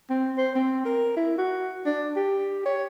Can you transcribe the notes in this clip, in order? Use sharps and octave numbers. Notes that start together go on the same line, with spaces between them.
C4
C5
C4
A#4
E4
F#4
D4
G4
C#5